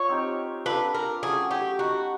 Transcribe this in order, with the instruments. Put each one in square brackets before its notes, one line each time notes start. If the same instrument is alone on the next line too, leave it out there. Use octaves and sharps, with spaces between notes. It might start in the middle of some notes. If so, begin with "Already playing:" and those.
Already playing: [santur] F4 [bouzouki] C#5
[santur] C4 D#4 G4
[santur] D4 F4 A4 D5 [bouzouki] B4
[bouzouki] A#4
[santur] F#3 A3 C#4 [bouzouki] G#4
[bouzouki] G4
[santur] B3 D#4 G4 [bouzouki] F#4